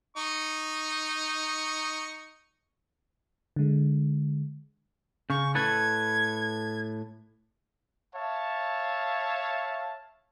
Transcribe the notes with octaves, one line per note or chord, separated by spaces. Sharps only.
D#4 C#6
D3 G#3
C#3 C#6
A2 A4 B4 G#6
C#5 E5 F5 A5